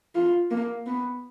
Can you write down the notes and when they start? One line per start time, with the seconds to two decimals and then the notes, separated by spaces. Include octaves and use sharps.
0.15 F4
0.51 A#3
0.86 B3